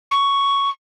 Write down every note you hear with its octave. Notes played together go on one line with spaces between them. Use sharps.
C#6